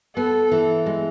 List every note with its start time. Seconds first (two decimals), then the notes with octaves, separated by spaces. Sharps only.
0.17 B3 A4
0.52 E3
0.86 G#3